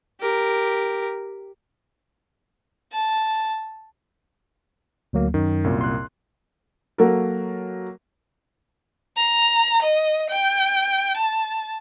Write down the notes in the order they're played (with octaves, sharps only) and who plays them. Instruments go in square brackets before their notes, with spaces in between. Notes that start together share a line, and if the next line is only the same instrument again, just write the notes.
[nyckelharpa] G4 A#4
[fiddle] A5
[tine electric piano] D2 F#3 A#3
[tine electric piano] F#2 [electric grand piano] D#3
[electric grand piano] C2 F#2 A#2
[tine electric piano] C6 F#6
[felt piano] F#3 A#3 F#4 A4 A#4
[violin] A#5
D#5
G5
A5